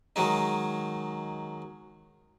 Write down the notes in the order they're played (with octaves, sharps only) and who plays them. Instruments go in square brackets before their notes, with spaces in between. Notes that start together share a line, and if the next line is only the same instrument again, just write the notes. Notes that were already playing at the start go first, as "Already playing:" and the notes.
[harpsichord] D#3 F#3 G#3 D#4